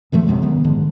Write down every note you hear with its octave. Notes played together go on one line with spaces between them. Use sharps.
F#2 B2 F3 A3
A1 F#2 C3 G#3
G1 D#3 B3
A#1 G#2 D3 D#3